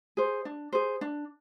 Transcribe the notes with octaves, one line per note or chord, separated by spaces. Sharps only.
G#4 C5
D4
G#4 C5
D4